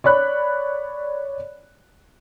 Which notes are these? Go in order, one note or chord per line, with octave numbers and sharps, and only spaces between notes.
C#5 D5 B5 F#6